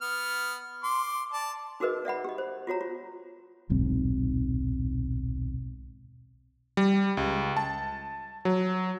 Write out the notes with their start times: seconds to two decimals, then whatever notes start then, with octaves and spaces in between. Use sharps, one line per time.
0.02 B3 F6
0.84 C6 D6
1.32 D5 A5
1.80 D#4 F#4 G#4 A#4 B4 D#5
2.05 D5 E5 F#5 B5
2.24 G4 D#5
2.38 C5
2.67 F4 F#4 C#5 A#5
2.81 F4
3.69 D#1 B1 G#2 C4
6.77 G3
7.17 C#2
7.57 A5
8.45 F#3